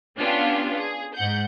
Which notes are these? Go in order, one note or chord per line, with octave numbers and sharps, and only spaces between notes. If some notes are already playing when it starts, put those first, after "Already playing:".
B3 C#4 D4 F4 G4
G#4
G#2 F#5 G6